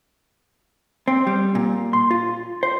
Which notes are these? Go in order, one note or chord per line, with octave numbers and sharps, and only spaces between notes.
C4
G3
A#2
C6
F4
C5